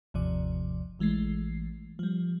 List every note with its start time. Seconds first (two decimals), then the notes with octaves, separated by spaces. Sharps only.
0.14 G1 D#2 C3 F3 D5
0.99 A1 E3 G#3 A3 C7
1.99 F3 G3